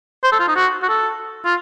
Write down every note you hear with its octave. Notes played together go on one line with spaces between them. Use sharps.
C5
A4
F4
D#4
F#4
F#4
A4
F4